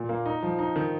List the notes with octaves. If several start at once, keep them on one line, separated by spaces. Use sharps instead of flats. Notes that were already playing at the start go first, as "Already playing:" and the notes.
Already playing: A#2
A#3
D#4
F3
D#4
D#3